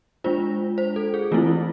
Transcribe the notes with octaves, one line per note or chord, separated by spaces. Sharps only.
G#3 D4 F4 C5
C5
A4
G#4
E3 A3 C4 E4 F4